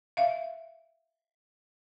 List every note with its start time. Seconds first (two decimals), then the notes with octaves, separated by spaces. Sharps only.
0.17 E5 F5